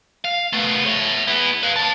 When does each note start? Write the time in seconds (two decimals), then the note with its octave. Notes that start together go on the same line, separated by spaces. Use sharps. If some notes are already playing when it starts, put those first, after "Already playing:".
0.25 F5
0.53 A3 B3
0.86 C#5 E5
1.27 B3 E4
1.63 B4 F5
1.76 C#5 A5